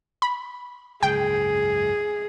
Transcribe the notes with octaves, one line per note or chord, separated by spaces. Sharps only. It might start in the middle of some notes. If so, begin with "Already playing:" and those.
B5
F#1 C#2 G#2 G#4 G5